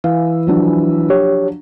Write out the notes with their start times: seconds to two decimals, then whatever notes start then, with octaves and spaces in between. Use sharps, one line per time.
0.04 E3 F5
0.47 F3 F#3 D4
1.10 G4 C#5